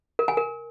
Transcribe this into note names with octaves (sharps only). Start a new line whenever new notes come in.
A#4
G#5
A#4